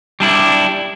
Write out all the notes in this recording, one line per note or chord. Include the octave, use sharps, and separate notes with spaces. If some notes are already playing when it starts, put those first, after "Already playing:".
G3 D4 E4